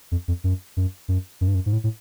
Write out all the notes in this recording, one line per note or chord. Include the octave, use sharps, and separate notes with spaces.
F2
F2
F#2
F#2
F#2
F#2
G2
F#2
G#2
A2
A2